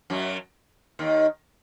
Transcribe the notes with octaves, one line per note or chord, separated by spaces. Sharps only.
F#2 F#3
D#2 D#3